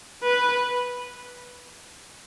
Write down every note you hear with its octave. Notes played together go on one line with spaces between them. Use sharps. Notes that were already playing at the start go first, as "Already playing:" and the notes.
B4